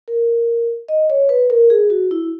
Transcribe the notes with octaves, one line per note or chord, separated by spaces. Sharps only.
A#4
D#5
C#5
B4
A#4
G#4
F#4
E4